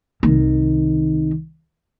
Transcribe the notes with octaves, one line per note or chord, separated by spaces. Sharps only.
C2 D#3